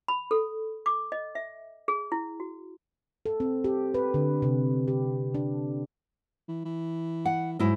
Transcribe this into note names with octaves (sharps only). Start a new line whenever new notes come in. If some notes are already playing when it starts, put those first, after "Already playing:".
B5
A4
D6
D#5
E5
G#4
E4
F#4
A4
C4
G4
B4
D3
C3
G4
D4
E3
E3
F#5
G#2 F#3 E4 D#5